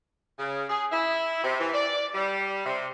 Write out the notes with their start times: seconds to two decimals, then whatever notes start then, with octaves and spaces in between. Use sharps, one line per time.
0.38 C#3
0.69 G#4
0.91 E4
1.43 C3
1.59 E3
1.73 D5
2.14 G3
2.66 C3